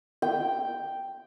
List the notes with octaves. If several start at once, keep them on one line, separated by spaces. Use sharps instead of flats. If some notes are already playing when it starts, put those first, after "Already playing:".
G5